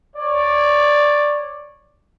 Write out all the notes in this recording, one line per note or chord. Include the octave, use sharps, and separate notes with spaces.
C#5 D5